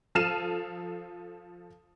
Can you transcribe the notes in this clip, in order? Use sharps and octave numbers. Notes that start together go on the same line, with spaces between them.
F3 A4 F6 C7 D#7 E7